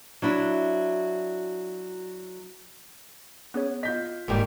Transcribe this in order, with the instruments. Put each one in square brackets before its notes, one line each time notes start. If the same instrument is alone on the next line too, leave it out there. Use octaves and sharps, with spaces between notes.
[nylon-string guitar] F#3 D4 E4
[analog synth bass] B3 [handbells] C#4 G#4 C#5
[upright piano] F4 G6 B6 [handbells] D#5
[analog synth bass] E1 [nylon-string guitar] G#2 D#3 G3 [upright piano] A#3 G4 A#4